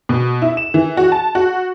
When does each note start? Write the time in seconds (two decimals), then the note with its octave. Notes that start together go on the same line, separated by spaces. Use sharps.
0.09 B2
0.42 E4
0.57 E7
0.74 E3
0.97 F#4
1.12 A5
1.35 F#4